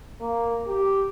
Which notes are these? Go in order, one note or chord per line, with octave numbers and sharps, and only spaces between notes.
A#3
G4